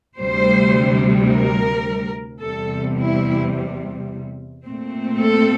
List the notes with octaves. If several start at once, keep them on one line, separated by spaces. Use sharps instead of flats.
D2 C3 G3 C5
A#4
E2 C3 G3 A4
E4
A#2 A3 C4
A4